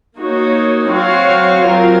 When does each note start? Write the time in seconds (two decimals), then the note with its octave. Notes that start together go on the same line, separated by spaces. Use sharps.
0.16 A#3 D#4 F#4 C#5
0.90 F#3 C4 F#4 C#5 F5
1.64 F#3 C4 F4 A#4